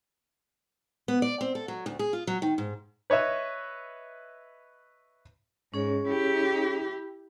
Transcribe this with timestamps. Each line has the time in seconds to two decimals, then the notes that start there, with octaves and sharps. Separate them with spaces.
1.08 B3
1.22 D5
1.41 C4
1.55 A4
1.68 F#3
1.86 D2
1.99 G#4
2.13 F4
2.27 F#3
2.42 D#3
2.58 G#2
3.10 B4 C#5 D#5 E5
5.74 G#2 C#4 G#4 C#5
6.08 E4 G4